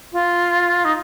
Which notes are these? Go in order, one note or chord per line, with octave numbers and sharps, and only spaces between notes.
F4
D#4